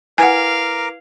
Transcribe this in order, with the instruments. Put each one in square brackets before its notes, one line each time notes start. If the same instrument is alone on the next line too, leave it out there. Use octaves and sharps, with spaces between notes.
[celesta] E4 B4 G#6 [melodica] A#4 D6 [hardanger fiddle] F5 [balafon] F#5 G#5